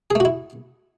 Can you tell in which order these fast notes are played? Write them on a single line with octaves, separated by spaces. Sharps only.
G#4 A3 F#4 E4